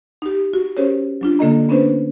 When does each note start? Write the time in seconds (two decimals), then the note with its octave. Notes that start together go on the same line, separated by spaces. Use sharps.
0.22 D#4 G4
0.53 F#4
0.77 C#4 G4 G#4 A#4 C5 C#5
1.21 F#3 D4 F4
1.39 D3 A#3 A4 D#5 A#5
1.69 B3 C#4 D4 B4 C5